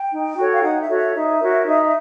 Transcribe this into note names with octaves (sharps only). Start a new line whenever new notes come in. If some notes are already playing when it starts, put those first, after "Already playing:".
Already playing: G5
D#4
F#4 A4 C#5
F5
D#4 F#5
E5
F#4 A4 C#5
E5
D#4 E5
F#4 A#4 C#5
D#4